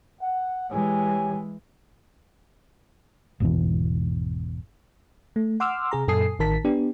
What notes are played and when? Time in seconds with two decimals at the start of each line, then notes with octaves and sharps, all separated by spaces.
0.21 F#5
0.71 E3 G#3 G4 C#5 G#5
3.40 G#1 E2 B2 E3
5.36 A3
5.60 F#5 C6 D6 E6 F6
5.91 C3 G#4 A#5
6.08 F#2 A#2 A4 G#5 D#6 C7
6.39 A1 D#3 A#4 A5 B6
6.65 B3 D4 G4